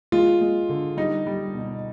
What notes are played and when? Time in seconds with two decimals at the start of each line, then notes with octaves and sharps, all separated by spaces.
0.12 G#3 F4
0.41 G#3
0.69 D3
0.97 G3 D#4
1.26 G3
1.54 B2